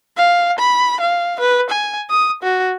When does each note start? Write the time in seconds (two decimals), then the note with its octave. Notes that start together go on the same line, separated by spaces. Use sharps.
0.17 F5
0.59 B5
1.00 F5
1.40 B4
1.70 G#5
2.10 D#6
2.43 F#4